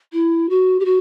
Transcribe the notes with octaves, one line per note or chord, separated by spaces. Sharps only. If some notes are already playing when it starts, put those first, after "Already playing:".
E4
F#4
G4
F#4